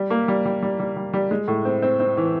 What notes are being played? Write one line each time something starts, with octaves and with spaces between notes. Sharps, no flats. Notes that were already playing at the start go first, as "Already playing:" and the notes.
Already playing: G3
A#3
G3
G3
G3
G3
G3
G3
G#3
A2
C4
C4
C4
E3